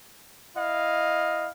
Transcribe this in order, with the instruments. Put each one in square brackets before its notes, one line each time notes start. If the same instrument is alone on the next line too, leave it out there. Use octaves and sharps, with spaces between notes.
[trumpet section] E4 D#5 F5